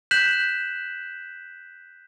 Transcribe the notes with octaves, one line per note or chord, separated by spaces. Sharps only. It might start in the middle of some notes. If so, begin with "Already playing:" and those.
F#6 G6 B6 E7 F#7